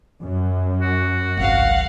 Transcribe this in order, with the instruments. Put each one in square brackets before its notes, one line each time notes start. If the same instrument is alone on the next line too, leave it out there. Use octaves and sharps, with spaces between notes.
[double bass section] F#2
[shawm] F#4
[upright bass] G#1 C#2 [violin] F5 F#5